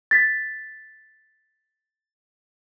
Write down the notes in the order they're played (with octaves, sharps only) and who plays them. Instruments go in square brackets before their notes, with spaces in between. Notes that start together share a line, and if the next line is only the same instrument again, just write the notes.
[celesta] A6 B6